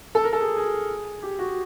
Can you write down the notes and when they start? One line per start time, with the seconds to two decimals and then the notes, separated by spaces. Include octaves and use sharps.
0.15 A4
0.24 A#4
0.33 A4
0.40 G#4
0.57 G#4
1.23 G4
1.39 F#4